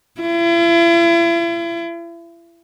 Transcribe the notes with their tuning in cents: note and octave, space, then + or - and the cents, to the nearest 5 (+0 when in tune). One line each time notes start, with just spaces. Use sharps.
E4 +40